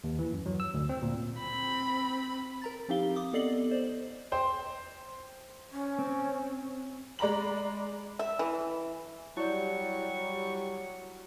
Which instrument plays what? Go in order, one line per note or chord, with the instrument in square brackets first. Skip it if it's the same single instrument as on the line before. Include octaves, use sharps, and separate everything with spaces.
[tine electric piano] D#2
E3
F#2
F#3
E6
D2
C4
A#2
[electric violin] C4 B5
[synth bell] A#4 A#5 A6
F3 C4 D#4 G4 F5 G7
D6 D#6
B3 A4 D5 D#5 C7 F#7
C5 D5
[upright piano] C5 G5 C6
[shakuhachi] C#4
[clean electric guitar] C4
[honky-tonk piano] G#3 D5 A#5 B5 F#7
[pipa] E5
E3
[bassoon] F#3 [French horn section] G3 [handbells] E4 D5 [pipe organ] C#6